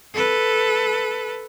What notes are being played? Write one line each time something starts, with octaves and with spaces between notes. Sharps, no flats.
A4 B4